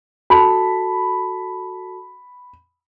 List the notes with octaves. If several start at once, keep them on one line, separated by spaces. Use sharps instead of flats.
F#4 A4 A5 B5